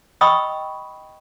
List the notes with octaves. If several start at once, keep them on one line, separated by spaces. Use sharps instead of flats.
D#5 G5 B5 C#6 D#6 E6